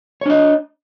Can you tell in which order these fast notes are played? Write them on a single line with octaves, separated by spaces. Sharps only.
C#5 D4 D#5